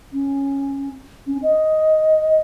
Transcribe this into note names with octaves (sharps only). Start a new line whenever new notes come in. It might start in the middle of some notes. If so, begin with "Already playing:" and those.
C#4
C#4
D#5